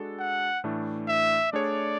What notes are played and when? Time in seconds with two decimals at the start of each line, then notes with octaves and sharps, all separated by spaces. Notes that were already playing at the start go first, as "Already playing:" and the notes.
Already playing: G#3 D4 F#4 A4
0.20 F#5
0.64 A2 E3 A3 D4
1.08 E5
1.53 A3 D4 G#4 C#5 D5